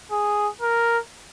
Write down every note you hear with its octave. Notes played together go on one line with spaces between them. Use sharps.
G#4
A#4